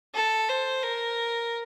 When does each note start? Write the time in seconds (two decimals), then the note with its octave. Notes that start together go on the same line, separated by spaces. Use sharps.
0.15 A4
0.49 C5
0.83 A#4